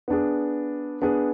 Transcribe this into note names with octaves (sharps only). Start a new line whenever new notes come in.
B3 D4 G#4
B3 D4 G#4